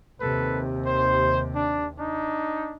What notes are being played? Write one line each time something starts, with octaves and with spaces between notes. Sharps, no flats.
D#2 C3 A4 B4
C5
D4
D4 D#4